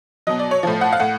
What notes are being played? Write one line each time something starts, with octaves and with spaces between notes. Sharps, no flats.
B2 F#3 D#5
D5
C#5
A2 F3
F#5
F5
A2 F#5